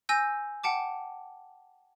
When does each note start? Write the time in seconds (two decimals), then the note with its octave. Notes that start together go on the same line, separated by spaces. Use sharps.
0.09 G#5 E6 G6 A#6
0.64 F#5 G5 A5 D6